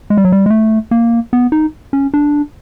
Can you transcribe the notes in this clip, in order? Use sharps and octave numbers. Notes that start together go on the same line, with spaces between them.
G#3
G3
F#3
G3
G#3
A3
A#3
B3
D#4
C#4
D4